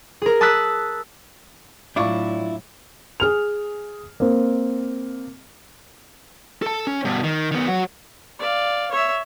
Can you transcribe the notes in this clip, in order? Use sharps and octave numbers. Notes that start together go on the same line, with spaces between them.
G#4 A#4
A5 D#6 E6 F#6 B6
A2 F#3 D4 E4 F4 D5 C#6 D6
G#4 F6 F7
A#3 C4
A4 A5
C#4
G2 B2
D#3
D#3 B3
F#3 F#4
D5 F5
C#5 E5